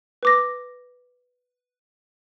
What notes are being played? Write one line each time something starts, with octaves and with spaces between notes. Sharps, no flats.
B4 D6 A#6